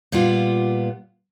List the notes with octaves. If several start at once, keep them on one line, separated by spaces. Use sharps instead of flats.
A#2 G3 B3 F4